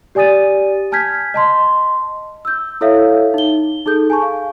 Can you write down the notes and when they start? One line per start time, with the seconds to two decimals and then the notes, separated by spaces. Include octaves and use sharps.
0.15 G4 D5 G#5 D#6 A6 D#7
0.92 G#5 A5 F6 G6 G#6 B6
1.34 D#5 A5 C6
2.45 E6 G6
2.81 E4 A4 C#5 E5 F5
3.34 D#4 G7
3.86 D#4 G#4 A4 G6
4.10 G#5 A5 C#6
4.22 F5